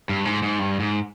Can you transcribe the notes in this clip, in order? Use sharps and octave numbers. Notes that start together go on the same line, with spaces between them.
G2
G#2
G#2
G2
G#2